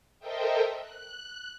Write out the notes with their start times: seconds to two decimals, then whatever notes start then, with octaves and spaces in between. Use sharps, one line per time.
0.19 A4 A#4 C5 D#5 E5 G5
0.80 F#6